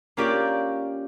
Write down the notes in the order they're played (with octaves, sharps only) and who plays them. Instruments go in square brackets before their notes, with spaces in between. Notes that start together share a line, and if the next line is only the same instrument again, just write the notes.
[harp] A#3 C#4 F4 G4 A#4 D5